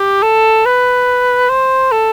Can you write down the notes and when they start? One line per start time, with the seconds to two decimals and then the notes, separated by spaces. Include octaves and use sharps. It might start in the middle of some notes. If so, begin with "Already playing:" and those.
Already playing: G4
0.23 A4
0.66 B4
1.50 C5
1.92 A4